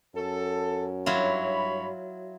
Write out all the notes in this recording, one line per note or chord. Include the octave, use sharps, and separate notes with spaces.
F#2 A4
G2 F#3 E4 F4 C#5 B5